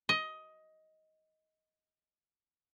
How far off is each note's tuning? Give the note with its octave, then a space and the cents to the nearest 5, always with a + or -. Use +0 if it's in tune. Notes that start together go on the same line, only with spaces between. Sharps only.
D#5 +15